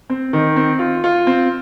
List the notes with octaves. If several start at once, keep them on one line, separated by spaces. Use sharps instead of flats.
C4
D#3
C4
F4
F4
C4